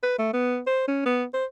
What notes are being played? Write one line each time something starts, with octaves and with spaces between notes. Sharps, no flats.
B4
A3
B3
C5
C#4
B3
C5